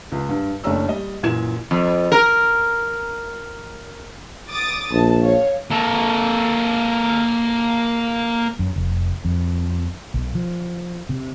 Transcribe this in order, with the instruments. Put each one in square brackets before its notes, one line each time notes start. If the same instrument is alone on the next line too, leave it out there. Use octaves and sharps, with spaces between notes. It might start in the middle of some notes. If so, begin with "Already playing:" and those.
[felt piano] C#2
G2
F#1 A3 C#4 D4 A#5 E6
G3 D#5
F#2 A#2 E3 G#6 E7
[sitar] F2
A#4
[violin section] D6 D#6 A6
[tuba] A#1 [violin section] A5
[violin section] C#5 F5
[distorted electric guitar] A#3 A4
[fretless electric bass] F#2
F1
F2
B1
F3
C3